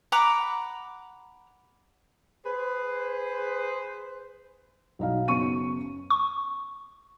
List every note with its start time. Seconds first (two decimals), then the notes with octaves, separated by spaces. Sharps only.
0.12 F#5 A#5 B5 D6
2.45 G#4 B4 C5
4.99 B1 D#4 F5
5.28 F#1 B3 C#4 C#6 D#7
6.10 C#6